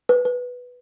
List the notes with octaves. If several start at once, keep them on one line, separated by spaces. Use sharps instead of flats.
B4
B4